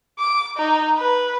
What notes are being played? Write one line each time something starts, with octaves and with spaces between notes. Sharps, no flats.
D6
D#4
B4